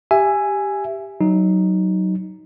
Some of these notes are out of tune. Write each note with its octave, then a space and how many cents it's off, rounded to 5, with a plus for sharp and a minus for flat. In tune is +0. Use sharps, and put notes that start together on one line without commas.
G4 +0 E5 +15 G#5 +0
F#3 +15 D#4 +0